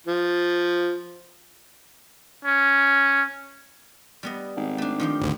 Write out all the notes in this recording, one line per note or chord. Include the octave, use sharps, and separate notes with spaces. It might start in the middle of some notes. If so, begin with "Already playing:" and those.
F3
C#4
G3 B3 D#5
G#1
A3 D4
D#3 F3 G4
G#1 D2